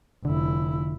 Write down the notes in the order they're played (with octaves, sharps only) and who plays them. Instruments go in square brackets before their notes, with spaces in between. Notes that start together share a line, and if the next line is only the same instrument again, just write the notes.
[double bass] F1 E4 [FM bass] D3